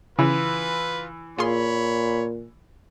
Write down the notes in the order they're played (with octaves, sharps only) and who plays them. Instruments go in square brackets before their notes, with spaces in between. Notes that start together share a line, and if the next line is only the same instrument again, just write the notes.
[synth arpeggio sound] C#3 [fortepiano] E3 [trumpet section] F4 B4
[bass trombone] A#2 [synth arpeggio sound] F4 G#4 C6 [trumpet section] C#5 B5